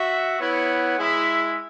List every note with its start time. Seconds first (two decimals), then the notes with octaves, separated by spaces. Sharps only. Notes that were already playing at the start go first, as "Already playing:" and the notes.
Already playing: F#4 E5
0.39 B3 E4 C#5 F#5
0.98 G#3 E4 G#4 E5